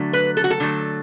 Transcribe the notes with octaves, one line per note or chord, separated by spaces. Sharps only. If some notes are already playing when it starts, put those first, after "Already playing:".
Already playing: D3 F#3 A3
B4
A4
F#4
A4
D3 F#3 A3